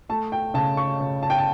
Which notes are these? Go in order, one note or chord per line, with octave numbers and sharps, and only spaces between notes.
A3 A5
G5
C#3 A5
C#6
C#3
A5
G5
A5